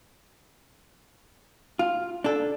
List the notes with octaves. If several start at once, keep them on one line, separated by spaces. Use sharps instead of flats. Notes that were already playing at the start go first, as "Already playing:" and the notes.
F4
D4 A4